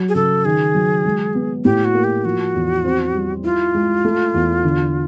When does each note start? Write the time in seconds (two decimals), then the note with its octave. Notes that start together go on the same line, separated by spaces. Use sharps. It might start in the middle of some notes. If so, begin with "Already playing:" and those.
Already playing: F#3
0.09 G#4
0.15 C#3 A4
0.45 D#3 G#4
0.75 F#3
1.05 G#3
1.35 B3
1.65 A2 G4
1.85 F#4
1.95 A#3
2.04 G4
2.25 F3 F#4
2.54 E2
2.84 C4
3.14 G3
3.44 E4 F4
3.74 G#3
4.05 A3
4.34 E2
4.64 D3